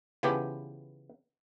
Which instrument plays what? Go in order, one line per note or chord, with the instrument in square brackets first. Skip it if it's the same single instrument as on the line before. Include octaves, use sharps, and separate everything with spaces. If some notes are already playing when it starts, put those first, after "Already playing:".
[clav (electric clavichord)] C#3 E3 F3 B3 G4